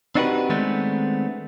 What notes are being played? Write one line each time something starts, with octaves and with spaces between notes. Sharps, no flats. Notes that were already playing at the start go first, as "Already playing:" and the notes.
C4 D4 D#4 F#4 G4 B4
D#3 G#3 A3 B3 C4 D4